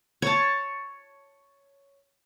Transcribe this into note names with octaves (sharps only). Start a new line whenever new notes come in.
C#5 A5